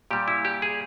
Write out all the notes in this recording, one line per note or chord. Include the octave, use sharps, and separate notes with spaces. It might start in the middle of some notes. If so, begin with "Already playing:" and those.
A#2 G3 G4
E4
G4
G#4